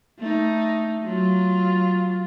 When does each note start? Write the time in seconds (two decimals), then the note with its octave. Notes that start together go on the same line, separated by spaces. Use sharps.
0.19 A3 D#4
1.04 F#3 F4